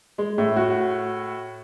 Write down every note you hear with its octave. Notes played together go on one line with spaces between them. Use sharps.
G#3
A2
F#4